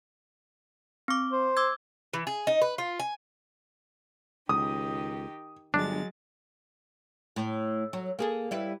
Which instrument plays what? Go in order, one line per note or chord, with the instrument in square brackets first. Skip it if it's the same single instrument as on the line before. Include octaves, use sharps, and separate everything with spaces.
[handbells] C4 D6
[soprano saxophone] C5
[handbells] D6 E6 G#6
[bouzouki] E3
G#4
D#4
B4
F4
G#5
[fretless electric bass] C#2 [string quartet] D#3 G4 [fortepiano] D#6
[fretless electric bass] G1 [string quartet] F#3 G#3 A6 [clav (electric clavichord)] D4
[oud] A2
F#3
A#3 G#4 A4
G3 E4 B4